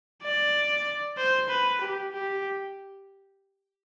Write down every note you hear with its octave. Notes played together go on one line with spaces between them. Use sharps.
D5
C5
B4
G4
G4